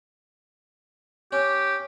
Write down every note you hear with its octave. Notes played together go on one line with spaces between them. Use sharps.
C#4 G4